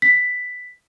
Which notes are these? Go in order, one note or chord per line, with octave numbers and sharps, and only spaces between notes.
B6